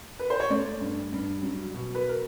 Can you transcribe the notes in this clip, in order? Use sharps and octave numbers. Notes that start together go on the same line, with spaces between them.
B4
C5
C#5
A3 D5
G2
G2
F#3
B2
B4
A#4